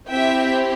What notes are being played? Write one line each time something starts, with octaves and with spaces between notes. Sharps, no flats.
C4 E4 G4 E5 G5